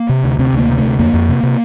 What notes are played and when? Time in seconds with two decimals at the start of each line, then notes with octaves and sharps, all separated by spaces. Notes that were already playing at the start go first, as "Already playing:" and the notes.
Already playing: A#3
0.09 C3
0.24 D2
0.39 C3 C4
0.53 D2
0.59 A#3
0.69 C3
0.78 A3
0.84 D2
0.99 F2 A#3
1.14 F2
1.29 C3
1.43 C3